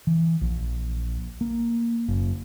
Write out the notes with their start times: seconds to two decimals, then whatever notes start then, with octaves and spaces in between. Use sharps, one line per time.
0.07 E3
0.41 A#1
1.41 A#3
2.08 F#1